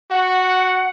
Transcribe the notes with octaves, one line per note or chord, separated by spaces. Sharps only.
F#4 F#5